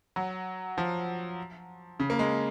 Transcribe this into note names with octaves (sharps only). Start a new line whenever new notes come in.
F#3
F3
C#3
A#3
G#3